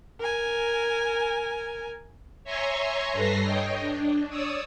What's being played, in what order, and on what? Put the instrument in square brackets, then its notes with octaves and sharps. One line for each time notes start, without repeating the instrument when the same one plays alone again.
[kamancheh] A#4 G#5
[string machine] C#5 E5 G#5 A#5 C6 C#6
G2 A4 B4 A#6 C7
C#5 D#5 G5
D4
C#5 D5 D#6 E6